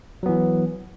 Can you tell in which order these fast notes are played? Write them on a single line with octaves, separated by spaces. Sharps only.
F#3 B3 E3